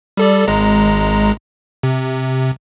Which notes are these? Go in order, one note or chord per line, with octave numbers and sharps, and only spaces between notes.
G3 A4 D5
G#1 G#3 A#5
C3